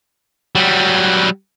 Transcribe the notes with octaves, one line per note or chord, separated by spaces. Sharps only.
F#3 G3